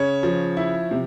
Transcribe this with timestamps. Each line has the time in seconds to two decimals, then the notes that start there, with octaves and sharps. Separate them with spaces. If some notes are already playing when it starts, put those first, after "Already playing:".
Already playing: C#3 C#5
0.23 F3
0.57 E4
0.91 C3